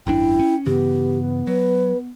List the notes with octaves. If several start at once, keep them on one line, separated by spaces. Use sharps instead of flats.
G#1 F#2 D4 E4 G5
C#4
G2 C#3 E3 B3 G4
F#3 B4